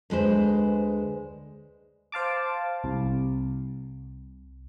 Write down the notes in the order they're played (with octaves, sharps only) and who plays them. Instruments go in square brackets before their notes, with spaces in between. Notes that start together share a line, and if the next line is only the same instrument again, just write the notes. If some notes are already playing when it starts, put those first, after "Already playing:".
[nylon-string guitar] D2 G#3 B4 C5
[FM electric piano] C5 F5 A5 D6
C2